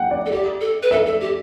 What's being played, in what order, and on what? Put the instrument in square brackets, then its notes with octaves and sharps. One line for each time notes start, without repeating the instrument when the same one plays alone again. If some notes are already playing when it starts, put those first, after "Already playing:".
Already playing: [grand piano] F#5 G5
D5
[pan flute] A4
[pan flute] G4 [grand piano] D5
[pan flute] A4
B4
[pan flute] A4 [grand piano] E5
[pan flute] A4
G4